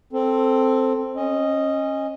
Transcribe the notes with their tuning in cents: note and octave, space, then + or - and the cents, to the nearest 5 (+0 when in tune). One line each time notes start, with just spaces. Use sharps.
C4 +0 A4 +5
C#4 -25 D#5 +0